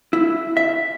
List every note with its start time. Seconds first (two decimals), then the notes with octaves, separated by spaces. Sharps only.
0.13 E4
0.57 E5